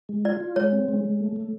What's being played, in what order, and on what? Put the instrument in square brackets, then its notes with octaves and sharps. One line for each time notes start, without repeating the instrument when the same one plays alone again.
[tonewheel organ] G#3
[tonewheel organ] F4 [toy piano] D5
[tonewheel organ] F4
[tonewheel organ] G#3 [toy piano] C#5
[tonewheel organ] C4
G#3
G#3
A3
A3